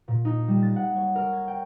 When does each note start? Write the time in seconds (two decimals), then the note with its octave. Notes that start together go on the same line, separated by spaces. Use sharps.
0.08 A#2
0.25 D#4
0.48 G3
0.62 A6
0.76 F#5
0.96 C#5
1.15 A#4
1.33 G#6
1.48 G5